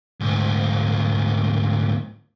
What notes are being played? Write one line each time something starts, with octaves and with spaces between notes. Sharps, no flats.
D2 G#2